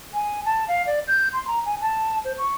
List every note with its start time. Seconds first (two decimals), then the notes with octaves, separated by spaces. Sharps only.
0.14 G#5
0.45 A5
0.68 F5
0.87 D5
1.08 G6
1.33 C6
1.47 A#5
1.66 G#5
1.81 A5
2.25 C5
2.38 C#6